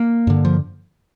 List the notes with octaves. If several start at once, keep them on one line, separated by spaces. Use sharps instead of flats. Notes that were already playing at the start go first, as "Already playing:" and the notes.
Already playing: A#3
G2 D3
F3